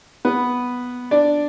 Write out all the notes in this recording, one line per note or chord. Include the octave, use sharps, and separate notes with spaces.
B3 B4
D4 D5